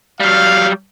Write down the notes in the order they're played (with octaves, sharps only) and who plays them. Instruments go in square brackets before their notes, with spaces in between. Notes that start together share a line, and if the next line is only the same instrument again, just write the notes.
[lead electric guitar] F#3 G3 [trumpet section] F5